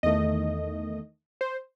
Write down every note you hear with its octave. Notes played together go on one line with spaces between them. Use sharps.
E2 D#3 A3 D#5
C5